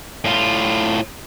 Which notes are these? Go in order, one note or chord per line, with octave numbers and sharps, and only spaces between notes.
A2 F4